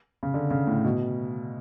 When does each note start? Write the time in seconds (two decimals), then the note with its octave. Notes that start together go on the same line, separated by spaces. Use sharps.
0.23 C#3
0.34 D3
0.50 C#3
0.67 A2
0.84 B2